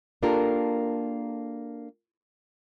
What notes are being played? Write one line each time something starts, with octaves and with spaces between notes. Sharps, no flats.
A#3 D4 F4 G4 A4 A#4